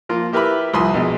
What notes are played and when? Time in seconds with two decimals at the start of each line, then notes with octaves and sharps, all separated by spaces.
0.09 F3 A#3 F4
0.32 E4 G4 A#4 B4 E5 B5
0.74 C2 F3 G#5 B5 C6 D#6
0.94 A#1 B2 G#3